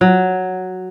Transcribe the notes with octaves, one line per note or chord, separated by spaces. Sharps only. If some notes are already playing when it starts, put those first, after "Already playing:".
F#3